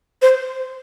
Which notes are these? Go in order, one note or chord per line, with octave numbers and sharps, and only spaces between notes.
C5